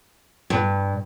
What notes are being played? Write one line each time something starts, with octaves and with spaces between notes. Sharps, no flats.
G2